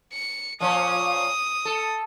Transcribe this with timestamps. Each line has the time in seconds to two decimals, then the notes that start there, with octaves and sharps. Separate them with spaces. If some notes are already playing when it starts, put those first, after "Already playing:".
0.13 C#7
0.60 A#2 F3 C#4 D#6
1.65 A4